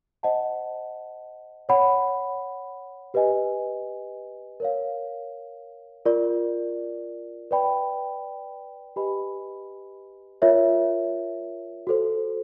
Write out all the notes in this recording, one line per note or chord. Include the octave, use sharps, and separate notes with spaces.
C5 D#5 F#5 A5
C#5 F#5 B5
G4 B4 D#5 G#5
A#4 C#5 F5
F4 A#4 D5
B4 D5 G5 B5
G4 B4 D#5 G#5 B5
F4 A#4 C#5 E5
F#4 A4 C5